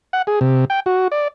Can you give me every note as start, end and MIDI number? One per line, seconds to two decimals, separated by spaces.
0.13 0.22 78
0.27 0.39 68
0.41 0.65 48
0.70 0.80 79
0.86 1.08 66
1.12 1.28 74